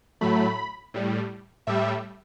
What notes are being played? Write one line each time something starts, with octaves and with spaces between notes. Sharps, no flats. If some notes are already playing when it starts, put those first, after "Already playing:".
A2 F#3 A3 B5
A2 G3
A2 G3 E5